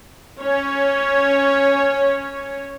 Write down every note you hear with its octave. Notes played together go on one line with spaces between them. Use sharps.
C#4 C#5